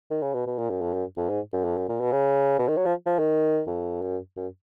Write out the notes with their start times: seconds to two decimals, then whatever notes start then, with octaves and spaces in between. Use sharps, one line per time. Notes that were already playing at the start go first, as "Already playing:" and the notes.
0.11 D#3
0.22 C#3
0.34 B2
0.47 B2
0.58 A#2
0.70 F#2
0.81 F2
0.94 F#2
1.17 F2
1.29 G#2
1.53 F#2
1.64 F2
1.77 F#2
1.89 A#2
2.00 B2
2.12 C#3
2.59 B2
2.68 D#3
2.77 F#3
2.85 F3
3.06 F3
3.19 D#3
3.66 F2
4.02 F#2
4.37 F#2